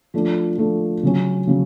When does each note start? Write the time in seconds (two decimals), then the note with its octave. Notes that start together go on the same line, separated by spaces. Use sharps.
0.14 F3 A3 D4
0.58 F3 A3 D4
1.03 C#3 F#3 C#4
1.47 C#3 F#3 C#4